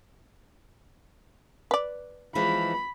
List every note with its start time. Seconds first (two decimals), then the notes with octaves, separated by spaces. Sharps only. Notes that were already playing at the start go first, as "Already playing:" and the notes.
1.71 B4 D5
2.35 E3 F3 G#3 B5